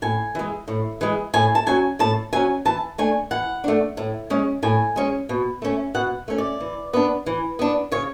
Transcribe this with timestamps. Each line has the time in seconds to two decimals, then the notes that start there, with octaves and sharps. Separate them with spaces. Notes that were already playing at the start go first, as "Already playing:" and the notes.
0.02 A2 G#5
0.35 E3 G#3
0.68 A2
1.01 E3 G#3
1.34 A2 G#5
1.55 A5
1.66 F#3 C#4 G#5
1.99 A2 A5
2.33 F#3 C#4 G#5
2.65 E3 A5
2.98 A3 D4 G#5
3.31 E3 F#5
3.64 A3 D4
3.97 A2
4.30 G#3 C#4
4.63 A2 G#5
4.96 G#3 C#4
5.29 B2
5.62 A3 C#4
5.94 B2 F#5
6.28 A3 C#4
6.38 D5
6.60 E3
6.93 B3 D4
7.26 E3
7.59 B3 D4
7.91 C#3 C#5